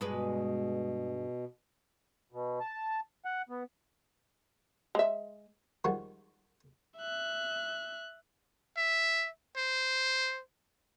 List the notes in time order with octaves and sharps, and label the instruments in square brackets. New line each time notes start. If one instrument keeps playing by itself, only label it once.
[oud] G2 G#3 B4 [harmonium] B2
[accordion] B2
A5
F#5
B3
[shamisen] G#3 E5
[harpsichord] D#3 F3 G3 G#3 F#4
[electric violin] E5 F#6
[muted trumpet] E5
C5